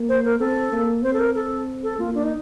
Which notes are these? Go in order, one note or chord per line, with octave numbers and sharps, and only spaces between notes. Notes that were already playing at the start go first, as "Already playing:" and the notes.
Already playing: A#3
C5
A#4
C4 A4
A#3
C4 C5
A4
A#4
A4
A4
A#3 F4
D4
D#4